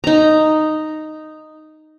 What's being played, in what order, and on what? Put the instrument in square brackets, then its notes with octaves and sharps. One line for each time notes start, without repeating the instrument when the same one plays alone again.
[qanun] D#4 A#5